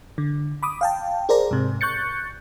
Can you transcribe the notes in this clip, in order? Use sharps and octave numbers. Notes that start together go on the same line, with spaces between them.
D3
B5 D6 D#6
F5 G5 A5
G#4 A#4 C5 D5 A#5
G#2 C3
C#6 F#6 G6 A6 C#7